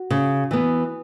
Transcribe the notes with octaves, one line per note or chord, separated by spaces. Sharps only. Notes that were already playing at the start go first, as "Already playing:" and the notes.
Already playing: F#4
C#3
E3 B3